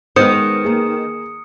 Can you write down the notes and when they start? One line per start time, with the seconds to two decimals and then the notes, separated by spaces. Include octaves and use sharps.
0.16 D#3 G#3 B3 B4 C5 D#6 C#7
0.65 A#3 G#4